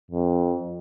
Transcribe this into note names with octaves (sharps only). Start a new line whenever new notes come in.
F2